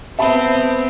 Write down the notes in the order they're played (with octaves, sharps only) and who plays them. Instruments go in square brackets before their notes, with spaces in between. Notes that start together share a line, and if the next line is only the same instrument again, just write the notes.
[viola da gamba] B3 C4 [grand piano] E5 A5 B5